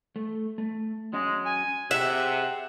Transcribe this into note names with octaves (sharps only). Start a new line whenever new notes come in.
A3
A3
F#3 G#3 C#4 D#5
G#5
C3 G#4 E5 F#5